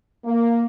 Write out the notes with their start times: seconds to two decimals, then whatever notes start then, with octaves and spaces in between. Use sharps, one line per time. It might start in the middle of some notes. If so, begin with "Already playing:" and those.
0.25 A#3